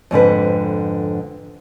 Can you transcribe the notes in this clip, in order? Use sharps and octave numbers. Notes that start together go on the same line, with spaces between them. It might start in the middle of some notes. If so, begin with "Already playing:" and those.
F2 G#2 D3 B4